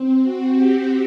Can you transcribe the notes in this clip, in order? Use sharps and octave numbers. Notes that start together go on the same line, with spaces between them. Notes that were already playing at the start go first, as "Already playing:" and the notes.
Already playing: C4
F#4
G4